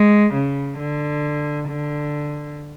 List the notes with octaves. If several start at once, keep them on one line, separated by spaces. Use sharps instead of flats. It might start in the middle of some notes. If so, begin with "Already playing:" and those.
Already playing: G#3
C#3
D3
D3